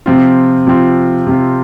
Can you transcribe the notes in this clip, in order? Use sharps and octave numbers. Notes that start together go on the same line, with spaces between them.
C3 F3 C4 F4
C3 F3 C4 F4
C3 F3 C4 F4